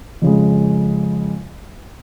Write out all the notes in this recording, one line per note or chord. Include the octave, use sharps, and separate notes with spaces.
F2 C#3 G#3